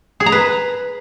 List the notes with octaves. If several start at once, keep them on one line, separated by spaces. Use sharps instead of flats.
G#4
A#5
B4